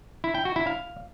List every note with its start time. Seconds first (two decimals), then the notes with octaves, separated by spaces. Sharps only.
0.24 E4
0.35 G5
0.45 F#4
0.56 E4
0.67 F5